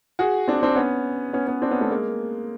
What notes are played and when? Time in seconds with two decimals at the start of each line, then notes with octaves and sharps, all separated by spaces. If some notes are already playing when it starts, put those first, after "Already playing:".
0.19 F#4 G#4
0.48 C4 D4
0.62 C4 D4
0.76 B3 C#4
1.33 B3 C#4
1.47 B3 C#4
1.62 C4 D4
1.71 B3 C#4
1.81 A3
1.90 G#3 A#3